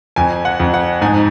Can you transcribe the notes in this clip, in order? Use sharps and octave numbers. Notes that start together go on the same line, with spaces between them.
F2 G#5
F#5
F2
F#5
G#2 G#5